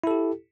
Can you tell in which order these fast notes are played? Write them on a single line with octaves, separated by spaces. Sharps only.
E4 A4 G4